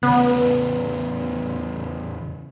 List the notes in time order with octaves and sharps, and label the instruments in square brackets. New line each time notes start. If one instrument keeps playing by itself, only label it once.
[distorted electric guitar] E2 C#3 [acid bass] B3